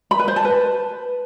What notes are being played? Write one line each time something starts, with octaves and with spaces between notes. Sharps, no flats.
B5
B4
C5
A5
B4